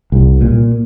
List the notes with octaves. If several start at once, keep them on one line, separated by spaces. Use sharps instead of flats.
C2
A#2